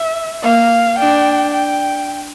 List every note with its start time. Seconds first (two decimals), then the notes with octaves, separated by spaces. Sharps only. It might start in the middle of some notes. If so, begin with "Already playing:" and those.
Already playing: E5
0.43 A#3 F5
0.98 D4 G5
1.54 G5